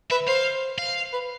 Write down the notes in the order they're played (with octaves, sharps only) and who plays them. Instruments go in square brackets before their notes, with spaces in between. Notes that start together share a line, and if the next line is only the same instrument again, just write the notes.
[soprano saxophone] B4 [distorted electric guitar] E5
[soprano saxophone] C5 [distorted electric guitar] F5
[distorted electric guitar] F5
[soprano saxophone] B4